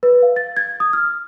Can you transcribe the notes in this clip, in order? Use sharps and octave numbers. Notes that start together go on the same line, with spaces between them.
B4
F5
A6
G#6
D#6
F6